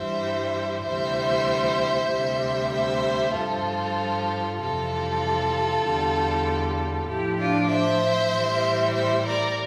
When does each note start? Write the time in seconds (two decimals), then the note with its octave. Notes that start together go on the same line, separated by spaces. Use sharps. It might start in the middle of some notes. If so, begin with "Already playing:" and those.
Already playing: G2 E3 G3 C5 E5
0.85 D2 C3 E3 G3 C5 E5
2.10 D2 C3 G3
2.72 C5 E5
3.34 G2 F3 F4 A4
4.58 F2 C3 E3 G3 F4 A4
5.83 E2 D3 G3
7.07 A2 F3 E4 G4
7.39 D4 F4
7.69 C5 E5
8.32 A2 E3 G3
8.94 C5 E5
9.25 A#4 D5